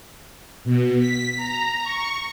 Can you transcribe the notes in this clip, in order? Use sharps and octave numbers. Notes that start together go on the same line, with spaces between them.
B2
B6
A#5
C#6